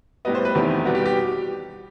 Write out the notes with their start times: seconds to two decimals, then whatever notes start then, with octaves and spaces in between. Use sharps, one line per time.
0.25 A2 G3 B3 D#5
0.35 C5
0.45 B4
0.55 E2 D#3 A3 C4 G4
0.85 B2 G3 B3 F#4
0.95 G4
1.06 G4